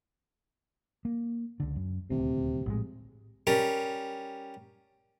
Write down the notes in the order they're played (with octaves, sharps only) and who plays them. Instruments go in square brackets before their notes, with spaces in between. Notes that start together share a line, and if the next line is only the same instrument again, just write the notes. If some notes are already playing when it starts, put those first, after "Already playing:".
[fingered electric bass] A#3
C#2 D3
F#2
[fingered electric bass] D#1 D2 [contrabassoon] C3
[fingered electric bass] A#1 A2 G#3
[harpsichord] G3 C#4 A#4